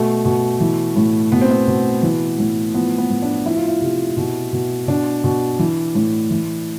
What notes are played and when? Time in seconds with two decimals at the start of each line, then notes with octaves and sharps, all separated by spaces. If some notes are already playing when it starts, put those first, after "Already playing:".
Already playing: B2 A3
0.25 B2
0.61 E3
0.96 A2
1.32 B2 B3
1.41 C4
1.51 B3
1.67 B2
2.03 E3
2.39 A2
2.74 F3 B3
2.98 B3
3.10 A2
3.22 D4
3.46 F3 E4
3.57 F4
3.68 E4
3.82 C3
4.17 B2
4.53 B2
4.88 B2 D4
5.24 B2
5.59 E3
5.95 A2
6.30 E3